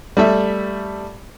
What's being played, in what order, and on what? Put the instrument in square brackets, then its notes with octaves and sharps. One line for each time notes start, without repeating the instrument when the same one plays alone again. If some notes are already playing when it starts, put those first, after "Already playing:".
[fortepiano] G3 A3 E5